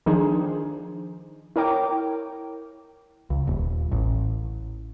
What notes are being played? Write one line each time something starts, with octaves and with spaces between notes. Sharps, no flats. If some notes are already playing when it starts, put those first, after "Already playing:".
D#3 F3 D4 D#4 G#4 C5
E4 A#4 C#5 G5 D6
C#2
D#1
A1